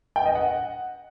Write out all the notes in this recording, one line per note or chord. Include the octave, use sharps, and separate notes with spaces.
G5
D#5
F#5